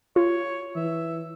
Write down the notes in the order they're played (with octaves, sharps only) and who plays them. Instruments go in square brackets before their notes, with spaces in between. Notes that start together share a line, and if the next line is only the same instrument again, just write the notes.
[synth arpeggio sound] F4 [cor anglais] C#5
[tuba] E3 [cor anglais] E5